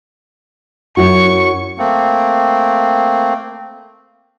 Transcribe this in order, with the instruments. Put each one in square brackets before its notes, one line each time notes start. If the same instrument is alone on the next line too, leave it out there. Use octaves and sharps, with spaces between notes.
[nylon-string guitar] F#2 E4 F#4 [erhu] C#6
[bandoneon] A3 A#3 C4